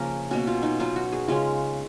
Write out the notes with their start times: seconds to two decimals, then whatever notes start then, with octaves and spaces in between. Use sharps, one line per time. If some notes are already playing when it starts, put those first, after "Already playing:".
Already playing: C#3 F3 A#3 C#4 A#4
0.31 B2 A#3 C#4 F#4
0.47 F4
0.63 D#4
0.80 F#3 B3 D#4 F4
0.96 F#4
1.12 G#4
1.28 C#3 G#3 C#4 F4